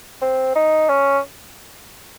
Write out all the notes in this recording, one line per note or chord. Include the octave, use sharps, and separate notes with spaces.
C4
D#4
C#4